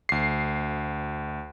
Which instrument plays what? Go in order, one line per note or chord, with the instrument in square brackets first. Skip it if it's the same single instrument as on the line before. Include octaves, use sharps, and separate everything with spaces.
[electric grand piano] D2 C7